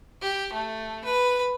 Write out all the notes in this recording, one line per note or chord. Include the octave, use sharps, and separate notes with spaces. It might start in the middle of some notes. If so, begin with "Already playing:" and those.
G4
A3
B4